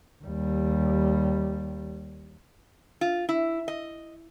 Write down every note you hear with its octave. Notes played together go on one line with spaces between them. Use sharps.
D#2 G3
F4
E4
D#5